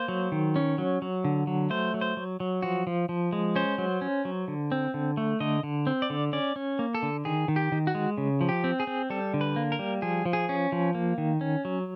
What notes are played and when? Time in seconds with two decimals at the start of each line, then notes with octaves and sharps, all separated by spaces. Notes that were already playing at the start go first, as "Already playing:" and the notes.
Already playing: A#3 C5
0.08 F#3
0.32 D#3
0.56 C#4
0.78 F#3
1.02 F#3
1.24 D3
1.47 F#3
1.70 A3 C5
1.94 F#3
2.01 C5
2.17 F#3
2.40 F#3
2.62 F3 F#4
2.87 F3
3.09 F3
3.33 G#3
3.56 C#4 C5
3.78 F#3
4.01 C#4
4.25 F#3
4.48 D3
4.72 C4
4.94 D3
5.17 A3
5.40 D3 D#5
5.63 D3
5.87 C4
6.02 D5
6.10 D3
6.33 C#4 D5
6.56 C#4
6.79 A#3
6.95 A4
7.03 D3
7.25 D#3 G#4
7.48 D#3
7.56 G4
7.72 D#3
7.87 F#4
7.95 G#3
8.18 C#3
8.41 F3
8.49 G4
8.64 C4
8.80 G#4
8.87 C4
9.10 G3 A4
9.34 D3
9.41 B4
9.56 A#3
9.72 A#4
9.79 G3
10.02 F3 G#4
10.26 F3
10.33 G#4
10.49 C#4
10.72 F3
10.95 A#3
11.18 D#3
11.41 C#4
11.65 F#3